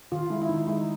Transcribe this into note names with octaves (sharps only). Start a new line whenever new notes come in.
D#3 F4
G#3 E4
E4
D#3 D#4
G#3 E4
D#4